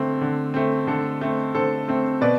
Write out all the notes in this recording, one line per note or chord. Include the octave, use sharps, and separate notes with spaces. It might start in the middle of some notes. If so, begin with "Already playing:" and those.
Already playing: D3 A3 C4
D3
A3 C4
D3 A4
A3 C4
D3 A4 C5
A3 C4
B2 B4 D5